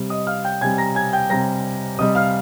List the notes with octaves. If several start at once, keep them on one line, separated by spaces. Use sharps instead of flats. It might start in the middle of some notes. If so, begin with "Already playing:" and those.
Already playing: C3 G3
D#5 D#6
F5 F6
G5 G6
C3 G3 G#5 G#6
A#5 A#6
G#5 G#6
G5 G6
C3 G3 A#5 A#6
C3 G3 D#5 D#6
F5 F6